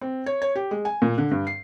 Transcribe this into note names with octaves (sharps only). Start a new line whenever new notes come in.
C4
C#5
C#5
G4
G#3
G#5
A#2
D3
G2
C7